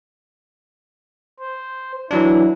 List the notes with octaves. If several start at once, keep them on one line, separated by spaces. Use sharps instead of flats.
C5
E3 F#3 D4 E4